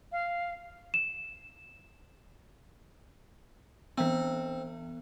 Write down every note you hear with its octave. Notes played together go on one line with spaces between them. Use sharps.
F5
E7
E3 B3 C4